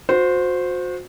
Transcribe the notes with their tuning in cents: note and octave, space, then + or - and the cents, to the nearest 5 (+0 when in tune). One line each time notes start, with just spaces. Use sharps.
F#4 -35 C5 -10